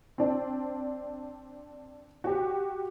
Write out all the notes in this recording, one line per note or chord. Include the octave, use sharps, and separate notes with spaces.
C4 D4
F#4 G4